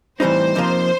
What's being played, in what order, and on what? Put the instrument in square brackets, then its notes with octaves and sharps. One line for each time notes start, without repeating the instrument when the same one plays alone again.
[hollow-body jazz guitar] A2 E3 G3 C4 D#4 [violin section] C5
[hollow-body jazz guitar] F2 C3 F3 A#3 D#4